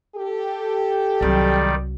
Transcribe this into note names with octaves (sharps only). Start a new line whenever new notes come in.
G4 A4
C2 D#3 F#3 G3 D5